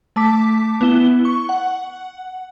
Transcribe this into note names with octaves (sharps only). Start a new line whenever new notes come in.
A3 A5 D6 B6
B3 E4 G7
C#6
F#5